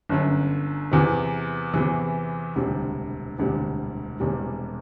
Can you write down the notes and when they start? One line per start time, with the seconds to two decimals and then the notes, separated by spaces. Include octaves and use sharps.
0.09 G1 F#2 D3
0.91 E2 C3 E3 B3
1.74 E2 C3 E3 B3
2.56 E1 D2 C3 G3
3.39 E1 D2 C3 G3
4.20 E1 E2 C3 G3